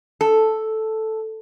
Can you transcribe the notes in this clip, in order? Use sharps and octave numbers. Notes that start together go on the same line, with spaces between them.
A4